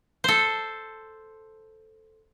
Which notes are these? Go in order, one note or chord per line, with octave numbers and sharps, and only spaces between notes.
A4 C5